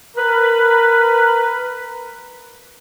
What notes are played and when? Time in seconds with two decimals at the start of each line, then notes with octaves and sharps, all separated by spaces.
0.16 A#4 B4